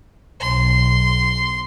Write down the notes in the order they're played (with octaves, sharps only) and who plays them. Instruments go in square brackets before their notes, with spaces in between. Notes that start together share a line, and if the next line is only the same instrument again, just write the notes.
[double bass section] B1 [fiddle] C6